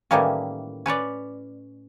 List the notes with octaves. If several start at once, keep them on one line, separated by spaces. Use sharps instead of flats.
A2 D#3 E3 G3 A#3 C#4
C#4 B4 C#5 D5